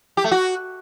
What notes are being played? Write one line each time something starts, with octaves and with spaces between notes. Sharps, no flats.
G4
A3
F#4